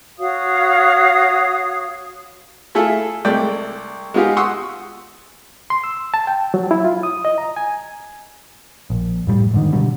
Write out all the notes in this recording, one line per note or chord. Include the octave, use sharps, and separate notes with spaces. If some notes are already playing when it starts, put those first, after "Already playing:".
F#4 C#5 F5 D#6
A3 E4 F4 G#4 A4
C2 G#3 A3 D5 G5
G#3 B3 D#4 F4 G4 G#4
F#5 C6 C#6 D#6 E6 F#6
C6
E6
A5
G5
F#3
E4
F4
D#6
D#5
A#5
G#5
A#1
F1 A2 G3
G#2 D3 D#3
B2 D3 F#3 G3